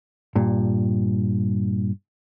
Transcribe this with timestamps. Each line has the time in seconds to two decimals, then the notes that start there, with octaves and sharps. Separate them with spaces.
0.35 G2 A#2